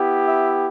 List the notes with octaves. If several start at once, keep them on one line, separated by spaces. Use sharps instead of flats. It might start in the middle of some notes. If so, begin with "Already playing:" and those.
Already playing: B3 E4 G4
E5